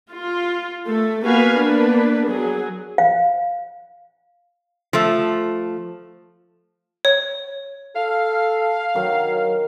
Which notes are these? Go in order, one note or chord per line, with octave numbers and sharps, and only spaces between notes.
F4
A3 A4
A#3 B3 F#4 B4 F5 G#5
A#3 B3 D4 B4
F#3 G#4
F5
F3 A3
C#5
A4 F5
D#3 F#3